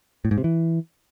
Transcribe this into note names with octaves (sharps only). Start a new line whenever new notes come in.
A2
G#2
C3
E3